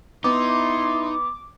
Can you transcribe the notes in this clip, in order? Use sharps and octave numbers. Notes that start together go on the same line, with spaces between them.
B3 D#4 E4 C6 D6